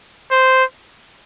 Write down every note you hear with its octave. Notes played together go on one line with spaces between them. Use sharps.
C5